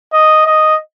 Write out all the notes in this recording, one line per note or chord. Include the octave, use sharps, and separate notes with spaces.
D#5
D#5